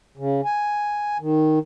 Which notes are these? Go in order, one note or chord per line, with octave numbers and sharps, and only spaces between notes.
C#3
G#5
D#3